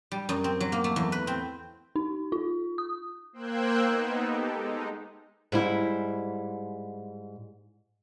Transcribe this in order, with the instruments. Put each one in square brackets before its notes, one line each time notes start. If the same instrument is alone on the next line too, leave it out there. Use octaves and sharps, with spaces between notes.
[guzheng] G3
F#2
C4
F#3
A#3
A3
E2
B4
C4
[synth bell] D#4
F4
D#6
[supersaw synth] A#3 C5 G5 E6 F#6 G#6
B3 D#4
G4 A4
G#3 D#4
[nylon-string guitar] G#2 G3 E4